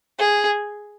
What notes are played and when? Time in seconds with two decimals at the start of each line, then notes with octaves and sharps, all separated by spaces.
0.19 G#4